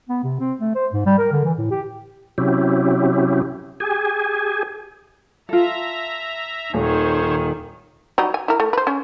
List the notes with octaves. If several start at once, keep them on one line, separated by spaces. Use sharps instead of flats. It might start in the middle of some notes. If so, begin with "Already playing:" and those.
B3
C3
C4
A3
C5
G#2
G3
A#4
D3
E3
A2
G4
C3 F#3 C#4 E4 G4
G4 G#4 G#5
F4 A4 E5 A#5
D#1 D#3 C5 C#5
F#3 G3 D#4
G#5
E4 A#4
A3
B4 C5
C#4